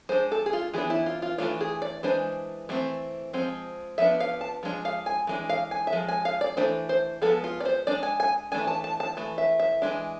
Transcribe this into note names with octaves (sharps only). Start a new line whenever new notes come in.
G#3 D4 C5
A4
G#4
F4
E3 B3 D4 G#4
E4
F4
F4
E3 A3 D4 F4
G#4
D5
E3 G#3 D4 C5
E3 A3 C4
F3 G#3 C4
F3 B3 D4 E5
F5
A5
F3 G#3 D4
F5
G#5
E3 G#3 D4
F5
G#5
E5
F3 G#3
G#5
F5
D5
E3 A3 D4 C5
C5
F3 G#3 B3 A4
F4
D5
C5
G#3 D4 D5
G#5
G#5
E3 A3 D4 G#5
A5
A5
A5
E3 A3
E5
E5
E3 G#3 D4